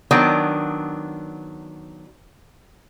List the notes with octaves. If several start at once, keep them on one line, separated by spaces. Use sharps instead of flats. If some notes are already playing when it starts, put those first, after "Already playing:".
D#3 F#3 B3 D4